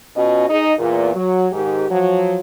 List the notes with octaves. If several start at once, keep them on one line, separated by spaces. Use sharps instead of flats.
B2 C#4 F4 F#4 D#5
D#4 G#4 D#5
E2 A#2
F#3
G#2 D#3 G4
F3 F#3